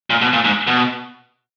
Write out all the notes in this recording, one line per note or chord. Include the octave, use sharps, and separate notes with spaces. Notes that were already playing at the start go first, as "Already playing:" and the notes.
A#2
B2
A#2
G#2
B2